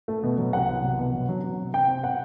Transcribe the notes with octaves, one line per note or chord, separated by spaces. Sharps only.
A3
B2
F#3
C2 F#5
F#3
C2
B2
F#3
F#3
F#3
C3
C3 G5
C4
C3 F#5